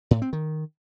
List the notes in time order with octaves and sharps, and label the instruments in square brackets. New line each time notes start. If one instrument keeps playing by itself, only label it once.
[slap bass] A2
C4
D#3